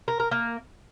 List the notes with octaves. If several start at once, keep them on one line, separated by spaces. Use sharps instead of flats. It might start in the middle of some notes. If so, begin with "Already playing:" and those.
A#4
A#4
A#3